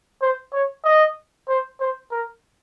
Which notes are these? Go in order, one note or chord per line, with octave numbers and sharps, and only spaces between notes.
C5
C#5
D#5
C5
C5
A#4